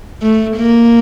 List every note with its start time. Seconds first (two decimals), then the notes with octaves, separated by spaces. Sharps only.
0.22 A3
0.57 A#3